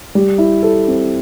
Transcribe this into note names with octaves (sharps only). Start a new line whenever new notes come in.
G3
E4
A4
C4